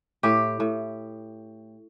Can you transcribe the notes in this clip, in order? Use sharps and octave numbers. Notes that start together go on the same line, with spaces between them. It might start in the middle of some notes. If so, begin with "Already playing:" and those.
A2 G4
A2